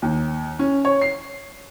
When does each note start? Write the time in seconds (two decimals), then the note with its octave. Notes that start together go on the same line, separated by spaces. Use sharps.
0.02 D#2
0.59 C#4
0.85 C#5
1.02 C7